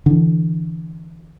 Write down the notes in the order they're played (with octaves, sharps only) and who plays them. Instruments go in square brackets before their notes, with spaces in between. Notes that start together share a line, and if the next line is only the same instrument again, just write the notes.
[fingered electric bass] D3 E3